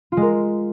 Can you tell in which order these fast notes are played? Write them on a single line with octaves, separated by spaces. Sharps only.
F4 G#3 A#4